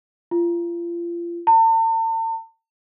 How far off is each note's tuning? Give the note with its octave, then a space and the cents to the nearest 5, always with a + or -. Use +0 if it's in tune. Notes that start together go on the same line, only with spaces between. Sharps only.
F4 -30
A5 +45